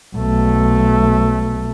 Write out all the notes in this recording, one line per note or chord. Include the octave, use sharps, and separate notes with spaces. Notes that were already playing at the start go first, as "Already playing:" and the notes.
B1 A3